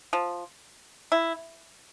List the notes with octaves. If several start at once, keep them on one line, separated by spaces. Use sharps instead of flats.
F3
E4